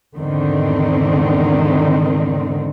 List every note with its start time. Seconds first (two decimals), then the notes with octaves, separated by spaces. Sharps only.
0.18 E2 G#2 D3 D#3 C4